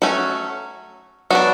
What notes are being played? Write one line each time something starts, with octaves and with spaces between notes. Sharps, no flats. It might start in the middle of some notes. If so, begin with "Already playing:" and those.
F#3 A3 C#4 F#4
F#3 B3 D4 F#4